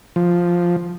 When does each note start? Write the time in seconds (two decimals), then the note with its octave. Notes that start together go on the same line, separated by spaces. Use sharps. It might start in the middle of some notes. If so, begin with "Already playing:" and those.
0.16 F3